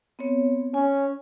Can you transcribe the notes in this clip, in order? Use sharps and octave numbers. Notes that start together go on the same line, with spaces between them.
B3 C4 C#5
C#4 G#5